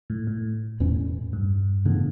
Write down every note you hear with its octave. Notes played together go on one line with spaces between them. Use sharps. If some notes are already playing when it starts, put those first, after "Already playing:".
A2
A2
E2 B2 A3 C#4
G2
A2 C#3 E3 B3 D4